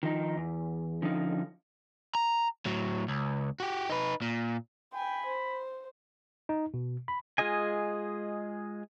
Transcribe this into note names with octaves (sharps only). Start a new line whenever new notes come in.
D#3 F3 D#4
E2
D3 F3 C#4 D#4
A#5
A2 F#3
C#2
F#4 G4
D#4 B4
A#2
G5 G#5 B5
C5
D#4
B2
B5
G#3 F4 G#4 D#5 G#5